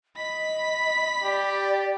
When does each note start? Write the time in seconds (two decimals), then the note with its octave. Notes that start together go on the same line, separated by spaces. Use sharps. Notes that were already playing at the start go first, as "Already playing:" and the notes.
0.17 D#5 B5 B6
1.23 G4 D5